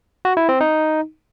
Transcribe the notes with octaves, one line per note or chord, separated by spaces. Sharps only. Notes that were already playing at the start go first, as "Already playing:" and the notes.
F#4
E4
C4
D#4